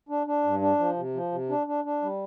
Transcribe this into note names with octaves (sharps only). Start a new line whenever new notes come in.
D4
D4
G2
D4
F3
C3
F3
C3
D4
D4
D4
G3